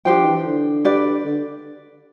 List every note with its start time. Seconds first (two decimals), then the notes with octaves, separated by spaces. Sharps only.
0.05 F3 D4 G4 C5 G5
0.25 E3
0.45 D3
0.85 G4 B4 D5
1.25 D3